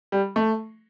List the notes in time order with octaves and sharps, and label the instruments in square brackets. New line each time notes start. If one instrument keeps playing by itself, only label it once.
[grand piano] G3
A3